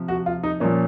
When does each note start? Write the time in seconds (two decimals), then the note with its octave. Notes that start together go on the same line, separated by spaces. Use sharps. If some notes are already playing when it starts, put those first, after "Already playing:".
Already playing: C3 F3
0.08 F#4
0.26 F4
0.43 D#4
0.60 A#2 F3 C#4